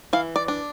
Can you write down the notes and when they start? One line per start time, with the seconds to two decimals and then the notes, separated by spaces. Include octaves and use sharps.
0.13 E3 F5
0.36 D5
0.48 D4